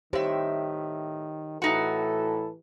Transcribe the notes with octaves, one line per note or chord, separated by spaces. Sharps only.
A2 D#3 G4 C5 C#5 E5
A2 E3 D#4 E4 F#4 A4